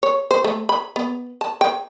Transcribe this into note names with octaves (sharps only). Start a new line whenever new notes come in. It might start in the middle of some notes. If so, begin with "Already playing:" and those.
C#5
C5
A3
B5
B3
A5
G5